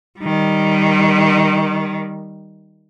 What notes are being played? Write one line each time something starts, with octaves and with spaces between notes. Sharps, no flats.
D#3 G3